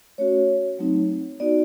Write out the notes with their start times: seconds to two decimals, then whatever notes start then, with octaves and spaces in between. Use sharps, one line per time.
0.18 A3 C#4 F#4 C#5
0.79 F#3 A3 C4 D#4
1.40 B3 D#4 F#4 D5